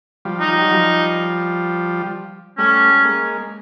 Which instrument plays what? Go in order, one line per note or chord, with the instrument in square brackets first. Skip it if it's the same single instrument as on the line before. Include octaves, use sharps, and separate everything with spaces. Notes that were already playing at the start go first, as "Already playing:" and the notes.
[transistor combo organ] F3 G3
[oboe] D#4
[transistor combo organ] F3
F#3
F3 G3
[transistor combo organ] G3 A3 [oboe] C#4
[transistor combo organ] G#3 A#3